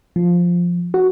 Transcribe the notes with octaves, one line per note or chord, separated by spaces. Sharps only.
F3
F#4